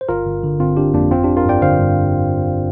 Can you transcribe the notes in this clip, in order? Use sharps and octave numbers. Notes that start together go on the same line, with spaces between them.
C5
G1 F4 A#4
G1
D3
G1 C4 F4
G1 D4 G4
F2 A#3 D4
G1 C4 F4
G1 D4 G4
F4 A#4
G2 D5 G5
D3 C5 F5
G2